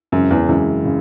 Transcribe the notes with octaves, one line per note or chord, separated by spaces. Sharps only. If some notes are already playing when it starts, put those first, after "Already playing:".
F#2 C#3 E3 G#3 C4
E2
F#2 C#3 E3 G#3 C4
C#3